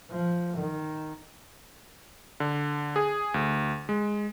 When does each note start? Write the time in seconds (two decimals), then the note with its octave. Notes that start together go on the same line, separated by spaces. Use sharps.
0.10 F3
0.57 D#3
2.40 D3
2.96 G#4
3.34 D2
3.89 G#3